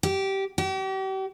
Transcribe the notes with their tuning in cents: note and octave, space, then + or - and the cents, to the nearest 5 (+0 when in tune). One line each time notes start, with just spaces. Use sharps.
G4 -15
G4 -40